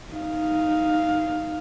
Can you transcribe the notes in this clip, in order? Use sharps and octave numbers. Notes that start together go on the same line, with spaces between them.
D#4 F5